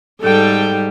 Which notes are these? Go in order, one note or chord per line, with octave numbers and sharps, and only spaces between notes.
G#2 G3 A4 G5